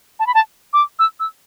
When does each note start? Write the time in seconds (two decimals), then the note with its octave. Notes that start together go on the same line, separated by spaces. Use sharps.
0.19 A5
0.27 B5
0.34 A5
0.73 D6
0.99 E6
1.20 E6